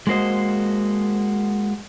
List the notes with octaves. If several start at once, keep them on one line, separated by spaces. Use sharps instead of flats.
G#3 A#3 F#4 C5 D#5